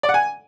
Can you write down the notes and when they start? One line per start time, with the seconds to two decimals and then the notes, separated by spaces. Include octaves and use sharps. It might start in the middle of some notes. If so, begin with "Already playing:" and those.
0.03 D5
0.09 F#5
0.14 G#5